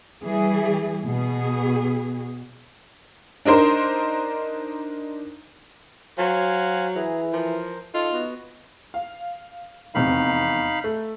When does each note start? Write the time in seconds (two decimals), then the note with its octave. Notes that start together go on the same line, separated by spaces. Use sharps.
0.24 E3 G3 G#4
1.03 B2 G#4
3.45 D4 D#4 A#4 C5
6.18 F#3 C5 F5 G#5
6.96 E3 G#4 A#5
7.33 F3 A#4 C5
7.94 D#4 F4 A4
8.12 B3 F#4
8.94 F5
9.95 F1 E2 C3 D#4 F5 B5
10.84 A3